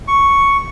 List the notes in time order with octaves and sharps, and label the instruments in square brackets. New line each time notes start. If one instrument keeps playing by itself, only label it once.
[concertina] C#6